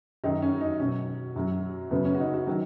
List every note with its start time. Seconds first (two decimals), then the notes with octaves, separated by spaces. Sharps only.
0.24 F#2 D#3 F#3 D#4
0.42 C#4
0.61 D#4
0.79 B2 F#3 C#4
1.36 F#2 F#3
1.91 F#2 C#3 F#3 B3
2.05 C#4
2.15 F#4
2.20 D#4
2.34 F#4
2.47 D#3 F#3